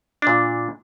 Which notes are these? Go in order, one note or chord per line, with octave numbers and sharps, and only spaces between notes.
A#2 D4